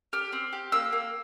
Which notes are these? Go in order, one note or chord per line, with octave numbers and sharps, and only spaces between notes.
G4 F6
C4
G4
A#3 E6
A#3